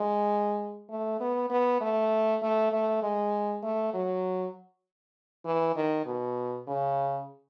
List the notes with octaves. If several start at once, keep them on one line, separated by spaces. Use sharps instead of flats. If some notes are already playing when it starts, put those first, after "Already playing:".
Already playing: G#3
A3
B3
B3
A3
A3
A3
G#3
A3
F#3
E3
D#3
B2
C#3